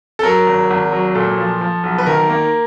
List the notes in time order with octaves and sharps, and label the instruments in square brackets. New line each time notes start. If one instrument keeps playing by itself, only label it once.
[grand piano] A4
F#3 A#4
G#1
G#1
F#3
A#2 A4
F3
F3
B1
B4
D#3 A#4
A#3